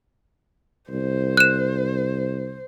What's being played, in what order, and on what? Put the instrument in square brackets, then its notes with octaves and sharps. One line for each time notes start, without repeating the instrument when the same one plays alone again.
[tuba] C2 [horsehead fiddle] C5
[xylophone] F#6 E7